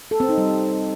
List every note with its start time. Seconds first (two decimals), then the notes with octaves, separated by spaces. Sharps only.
0.11 A4
0.20 C4
0.29 D#4
0.38 G3